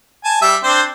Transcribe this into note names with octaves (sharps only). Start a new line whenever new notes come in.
G#5 A5
G3 E5
C4 D4 C5